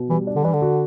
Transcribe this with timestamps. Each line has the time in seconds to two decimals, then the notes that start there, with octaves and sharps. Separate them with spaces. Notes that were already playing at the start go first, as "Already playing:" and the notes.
Already playing: B2
0.10 E3 G3
0.27 D4
0.36 D3
0.44 E3 D4
0.53 D3
0.62 F#4